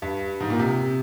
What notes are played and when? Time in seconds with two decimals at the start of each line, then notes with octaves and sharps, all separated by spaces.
0.02 G2
0.40 G#2
0.50 A#2
0.59 C3